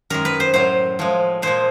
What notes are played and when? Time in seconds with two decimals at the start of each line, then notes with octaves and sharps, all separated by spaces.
0.10 F#2 D#3 G#3 A#4
0.25 B4
0.40 C5
0.54 A2 F#3 C5
0.99 A2 F3 G#3
1.42 A#2 F3 G#3 C5